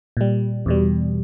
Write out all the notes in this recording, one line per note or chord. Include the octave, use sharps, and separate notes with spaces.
A#2 G3
E2 B2 G3